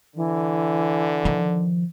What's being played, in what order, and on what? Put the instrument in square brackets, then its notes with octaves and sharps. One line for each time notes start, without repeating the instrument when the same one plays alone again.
[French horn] D3 [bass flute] E3
[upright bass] D#3 F3